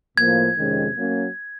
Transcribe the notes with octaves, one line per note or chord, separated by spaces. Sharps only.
A2 F3 A#3 G#6
F2 C3 D#3 G#3 C#4
F#3 A#3 C#4